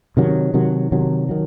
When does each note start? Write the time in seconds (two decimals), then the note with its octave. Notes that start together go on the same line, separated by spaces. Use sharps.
0.17 C3 D#3 F#3
0.54 C3 D#3 F#3
0.92 C3 D#3 F#3
1.29 D#3 F#3